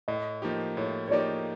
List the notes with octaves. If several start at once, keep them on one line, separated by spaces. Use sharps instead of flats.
A2 D#5
F3 A#3 D#4 G4
A2 C#5
C#5
F3 A#3 D#4 G4 D5